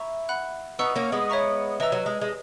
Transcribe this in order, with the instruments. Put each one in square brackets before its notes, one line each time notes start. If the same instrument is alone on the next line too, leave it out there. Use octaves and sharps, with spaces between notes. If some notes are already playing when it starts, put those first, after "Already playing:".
Already playing: [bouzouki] E4 [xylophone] E5 A#5 C#6
[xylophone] F#5 B5 F#6
[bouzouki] B3 D#4 [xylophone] F#5 C#6 E6
[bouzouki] A#3 C#4
G#3 B3
[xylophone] C#5 E5 A#5 C#6
[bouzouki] E3 [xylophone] B4 D#5 A#5 E6
[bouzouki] F#3
G#3
G#3